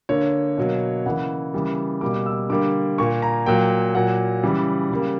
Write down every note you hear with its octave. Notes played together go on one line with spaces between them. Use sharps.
D3 A#3 C#5
B2 F#3 A#3
C#3 E3 A#3 F#5
C#3 E3 G3 A#3
B2 G3 A#3 D6
E6
D3 G3 A#3 D6
A#2 A#3 C#6
A#5
A#2 F#3 A#3 G5
A#2 F#3 A#3 F#5
C#3 E3 G3
C#3 G3 A#3